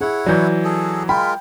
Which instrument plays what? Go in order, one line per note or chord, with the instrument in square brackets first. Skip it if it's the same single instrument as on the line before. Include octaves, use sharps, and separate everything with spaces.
[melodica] E4 C#5 F#5 [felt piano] G#4
[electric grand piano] E3 F#3 [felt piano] D5 G6 G#6
[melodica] G#4 A4
[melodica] G#3 F4 A#4 [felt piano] G5 [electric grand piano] B5